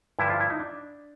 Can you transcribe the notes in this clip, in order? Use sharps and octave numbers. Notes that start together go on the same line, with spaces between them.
G2 D3 F3 E4
F4
E4
D#4
D4